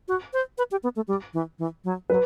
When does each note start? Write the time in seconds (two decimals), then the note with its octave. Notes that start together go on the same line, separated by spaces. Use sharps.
0.08 F#4
0.33 C5
0.58 B4
0.71 G4
0.83 B3
0.96 A3
1.08 G3
1.34 E3
1.59 E3
1.84 F#3
2.10 F#3 B4